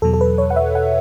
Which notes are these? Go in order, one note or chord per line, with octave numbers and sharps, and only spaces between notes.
E2 B2 F#3 A4
A4
B4
C#5
F#5
E5
F#5